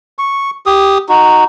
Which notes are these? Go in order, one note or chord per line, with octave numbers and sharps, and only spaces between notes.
C#6
G4 D#6
D#4 F#4